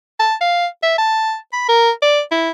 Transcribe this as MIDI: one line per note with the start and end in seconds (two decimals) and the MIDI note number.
0.19 0.35 81
0.41 0.66 77
0.83 0.97 76
0.98 1.36 81
1.53 1.66 83
1.68 1.90 70
2.02 2.21 74
2.31 2.50 64